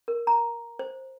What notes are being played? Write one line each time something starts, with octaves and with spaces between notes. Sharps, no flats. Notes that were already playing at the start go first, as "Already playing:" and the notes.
A#4
A#5
C5